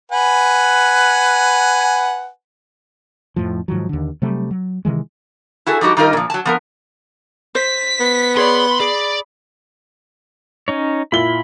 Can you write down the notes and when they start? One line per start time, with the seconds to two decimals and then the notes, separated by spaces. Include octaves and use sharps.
0.12 B4 F#5 G#5
3.36 F2 A2 F3
3.68 G#2 D#3 F3 F#3
3.89 D#2 D3
4.22 C3 F#3 G3 A3
4.51 F#3
4.85 C3 D#3 E3 G#3
5.66 E4 F#4 G#4 A4
5.81 F3 G3 D#4 F#4 G4
5.97 D#3 G3 D#4 F4 A#4
6.13 A#2 F3
6.30 F#3 A5
6.45 F3 B3 A#4
7.55 C5 B6
8.00 B3
8.37 G#4 C#5 D5 B5 C6
8.80 G#4 D5
10.68 C#4 D#4 C#5
11.12 A#2 E4 B5 G7